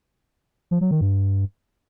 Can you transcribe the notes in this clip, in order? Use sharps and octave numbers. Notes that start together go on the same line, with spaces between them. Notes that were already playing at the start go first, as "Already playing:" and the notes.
F3
F#3
D#3
G2